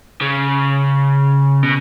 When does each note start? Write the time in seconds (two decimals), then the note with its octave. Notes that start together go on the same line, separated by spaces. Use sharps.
0.21 C#3
1.63 B2